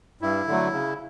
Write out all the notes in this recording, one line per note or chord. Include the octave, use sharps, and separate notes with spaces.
G2 E4
D3 F#3 A3
C#3